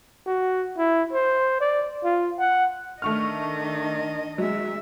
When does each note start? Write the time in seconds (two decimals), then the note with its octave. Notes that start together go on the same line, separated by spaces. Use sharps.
0.26 F#4
0.78 E4
1.12 C5
1.61 D5
2.04 F4
2.39 F#5
3.02 D#3 A3 D4 D#5 C#6 F6
4.38 F#3 G#3 E5